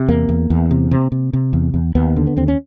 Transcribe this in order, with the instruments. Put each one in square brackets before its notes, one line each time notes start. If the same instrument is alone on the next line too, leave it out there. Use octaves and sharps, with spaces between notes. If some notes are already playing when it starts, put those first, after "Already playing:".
Already playing: [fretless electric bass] C3
E2 A#3
E2
E2
C3
C3
C3
C3
E2
E2
D#2 B3
D3
B3
D#2 C4
C#4